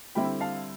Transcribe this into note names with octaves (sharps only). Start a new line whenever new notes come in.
D3 G3 C4 E4 G5 B5
F5 A5